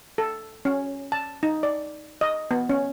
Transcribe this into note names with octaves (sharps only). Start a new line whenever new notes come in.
A4
C#4
A5
D#4
D5
D#5
B3
C#4